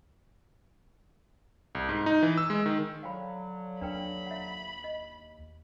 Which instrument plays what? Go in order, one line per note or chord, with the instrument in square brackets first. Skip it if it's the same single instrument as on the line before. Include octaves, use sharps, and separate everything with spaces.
[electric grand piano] C2
G#2
D#4
E3
E6
G#3
D#3
[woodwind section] D3 F3 F#3 [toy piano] F5 G5 B5
[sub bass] D#2 [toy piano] D4 B4 G5 [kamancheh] B5
[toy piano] E5 F#5
D#5